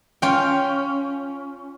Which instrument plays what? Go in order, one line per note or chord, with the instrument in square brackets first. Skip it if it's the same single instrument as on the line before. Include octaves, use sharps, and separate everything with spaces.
[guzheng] C#4 F4 G5